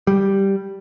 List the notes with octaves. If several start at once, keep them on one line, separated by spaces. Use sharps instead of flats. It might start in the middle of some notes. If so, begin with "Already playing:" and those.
G3